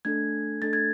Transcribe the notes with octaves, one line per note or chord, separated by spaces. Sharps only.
A3 D4 A4 G#6
A3 D4 A4 A6
G#6